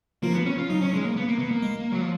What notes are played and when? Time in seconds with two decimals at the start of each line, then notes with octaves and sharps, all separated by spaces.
0.22 F3 A#3 F4
0.34 B3
0.46 C#4
0.58 F4
0.69 F#3 D#4
0.81 C#4
0.93 G#3
1.05 A#3
1.16 B3
1.28 A#3
1.39 B3
1.51 A#3
1.62 G#3
1.92 F#3
2.01 F3